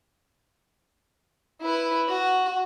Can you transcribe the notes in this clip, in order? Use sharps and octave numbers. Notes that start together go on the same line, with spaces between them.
E4 B4
F#4